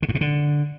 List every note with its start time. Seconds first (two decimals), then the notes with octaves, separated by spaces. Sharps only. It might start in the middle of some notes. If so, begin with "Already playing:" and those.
0.02 D3
0.09 G2
0.15 B2
0.21 D3